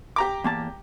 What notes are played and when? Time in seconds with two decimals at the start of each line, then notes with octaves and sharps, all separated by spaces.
0.16 G4 A#5 D6
0.44 E2 A#3 A5